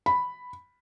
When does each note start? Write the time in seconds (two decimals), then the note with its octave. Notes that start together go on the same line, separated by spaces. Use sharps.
0.06 B5